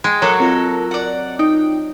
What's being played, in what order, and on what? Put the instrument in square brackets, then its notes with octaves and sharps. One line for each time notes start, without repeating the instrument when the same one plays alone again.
[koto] G#3 [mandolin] G5
[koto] F#3 [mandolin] A#3 F#4 A4 [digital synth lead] C#5
[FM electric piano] C4 F4 D#5 [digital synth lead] A#4
[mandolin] D5 F#5
[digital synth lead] D#4 [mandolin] G5